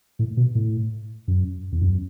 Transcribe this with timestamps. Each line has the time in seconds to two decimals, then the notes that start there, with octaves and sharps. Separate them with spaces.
0.19 A2
0.37 B2
0.55 A2
1.28 F#2
1.72 E2
1.82 F#2